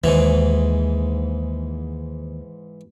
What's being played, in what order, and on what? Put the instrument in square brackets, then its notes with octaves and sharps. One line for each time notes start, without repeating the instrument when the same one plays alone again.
[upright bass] D#2 [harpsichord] G#2 E3